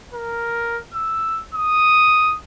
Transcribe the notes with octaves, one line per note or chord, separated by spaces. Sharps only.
A#4
E6
D#6